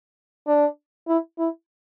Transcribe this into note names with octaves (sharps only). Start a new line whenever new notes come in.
D4
E4
E4